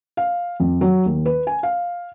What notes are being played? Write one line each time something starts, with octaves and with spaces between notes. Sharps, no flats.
F5
F2
F#3
D#2
B4
G#5
F5